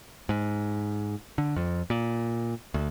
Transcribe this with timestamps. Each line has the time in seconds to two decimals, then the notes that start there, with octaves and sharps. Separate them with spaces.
0.29 G#2
1.38 D3
1.56 F2
1.90 A#2
2.74 D2